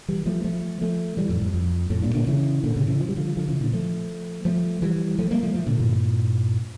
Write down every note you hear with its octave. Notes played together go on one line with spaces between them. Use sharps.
E3 G3
F3 A3
F3 A3
F3 A3
E3 G3
F2 A2
F2
F2
F2 A2
G2 A#2
A#2 D3
C#3 E3
A#2 D3
A2 C#3
C#3 E3
F3
G3
D3 F3
D3 F3
C#3 E3
A#2 D3
F3 A3
F3 A3
E3 G3
F3 A3
G3 A#3
F3 A3
F3 A3
A#2 D3
G2 A#2